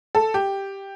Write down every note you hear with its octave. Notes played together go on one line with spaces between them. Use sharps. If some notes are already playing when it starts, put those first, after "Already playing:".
A4
G4